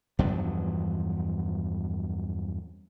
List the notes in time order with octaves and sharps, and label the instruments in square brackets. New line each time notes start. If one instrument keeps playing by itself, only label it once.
[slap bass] E2 G2 F3 F#3